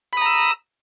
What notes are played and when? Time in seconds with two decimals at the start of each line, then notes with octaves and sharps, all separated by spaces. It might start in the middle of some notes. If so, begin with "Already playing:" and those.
0.13 B5
0.17 D#6
0.21 A#5
0.26 E6